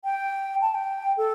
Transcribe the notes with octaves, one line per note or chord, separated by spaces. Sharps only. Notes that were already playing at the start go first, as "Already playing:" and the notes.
G5
A5
G5
A4